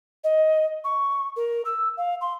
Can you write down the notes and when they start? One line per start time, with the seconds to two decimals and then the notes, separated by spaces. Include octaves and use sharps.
0.24 D#5
0.84 C#6
1.36 A#4
1.65 E6
1.97 F5
2.21 C6